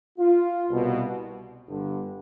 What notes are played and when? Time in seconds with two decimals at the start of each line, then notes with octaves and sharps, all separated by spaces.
0.19 F4
0.68 C2 B2
1.67 G1 G2 D3